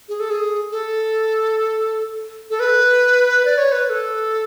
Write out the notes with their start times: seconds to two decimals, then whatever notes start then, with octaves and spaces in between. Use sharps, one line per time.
0.09 G#4
0.20 A4
0.30 G#4
0.71 A4
2.50 A4
2.60 B4
3.45 D5
3.58 C#5
3.72 B4
3.85 B4
3.90 A4